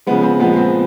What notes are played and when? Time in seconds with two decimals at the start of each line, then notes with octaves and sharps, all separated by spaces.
0.07 C#3 F3 G#3 B3
0.23 C4
0.39 A#2 F3 G#3 B3
0.56 C4